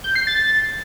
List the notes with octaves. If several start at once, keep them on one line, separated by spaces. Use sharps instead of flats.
G6
C7
A6